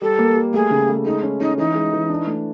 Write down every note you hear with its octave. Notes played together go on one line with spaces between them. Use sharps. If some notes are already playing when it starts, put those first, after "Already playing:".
G3 A4
A#3
G3
A3 G#4
C#3
A3
G#3 D#4
C#4
C#4 D#4
E3 D#4
G#3
E3
D4
A3